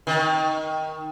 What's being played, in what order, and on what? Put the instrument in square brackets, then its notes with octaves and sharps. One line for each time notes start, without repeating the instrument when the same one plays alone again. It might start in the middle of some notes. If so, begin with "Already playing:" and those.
[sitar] D#3